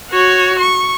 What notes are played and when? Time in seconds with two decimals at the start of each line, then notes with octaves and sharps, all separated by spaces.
0.11 F#4 C#5
0.59 C#6